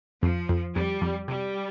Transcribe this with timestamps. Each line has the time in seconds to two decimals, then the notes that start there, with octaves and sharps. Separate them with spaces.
0.22 F2 F3
0.49 F2
0.75 F2 G3
1.02 F2
1.28 C3 G3